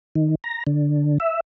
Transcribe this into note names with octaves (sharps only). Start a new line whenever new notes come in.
D#3
A#5
D3
E5